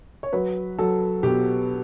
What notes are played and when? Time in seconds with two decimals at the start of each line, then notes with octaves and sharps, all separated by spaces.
0.23 C#5
0.33 F#3 B4
0.79 F#3 A4
1.23 B2 G4